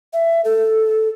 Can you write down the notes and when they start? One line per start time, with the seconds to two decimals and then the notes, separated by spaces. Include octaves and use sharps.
0.13 E5
0.45 A4